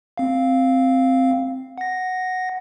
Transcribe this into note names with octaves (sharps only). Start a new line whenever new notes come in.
C4 F5
F#5 A#6